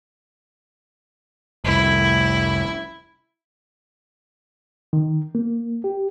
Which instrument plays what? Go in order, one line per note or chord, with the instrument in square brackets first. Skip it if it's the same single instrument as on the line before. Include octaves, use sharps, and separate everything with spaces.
[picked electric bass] F1 C2 [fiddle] E4
[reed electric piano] D#3
A#3
G4